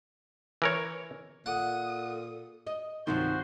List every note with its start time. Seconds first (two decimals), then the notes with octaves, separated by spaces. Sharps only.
0.62 E3 A#4 C#5
1.46 A#2 A4 F#5 D#6
2.67 D#5
3.07 C2 G2 D#3 F3 F#3 F#4 C5 C6